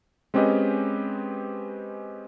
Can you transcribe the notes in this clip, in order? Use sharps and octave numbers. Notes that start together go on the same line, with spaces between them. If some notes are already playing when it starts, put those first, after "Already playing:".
G#3 C4 C#4 G4 B4 D#5